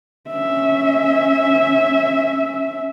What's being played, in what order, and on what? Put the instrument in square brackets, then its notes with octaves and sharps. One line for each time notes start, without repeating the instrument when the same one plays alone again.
[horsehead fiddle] C#4 E5